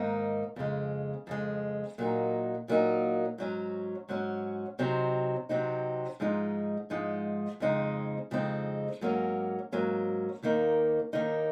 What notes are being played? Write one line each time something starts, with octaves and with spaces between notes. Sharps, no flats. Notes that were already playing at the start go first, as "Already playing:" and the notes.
Already playing: G#2 D#3 A#3 D#4
F2 C#3 G#3
F2 C#3 G#3
A#2 F#3 A#3 D#4
A#2 F#3 A#3 D#4
G#2 F#3 C#4
G#2 F#3 C#4
C3 F#3 C4 D#4
C3 F#3 C4 D#4
G#2 F3 G#3 D#4
G#2 F3 G#3 D#4
F2 C#3 G#3 C4 D#4
F2 C#3 G#3 C4 D#4
G#2 F#3 A#3 C#4
G#2 F#3 A#3 C#4
D#2 D#3 A#3 D#4
D#2 D#3 A#3 D#4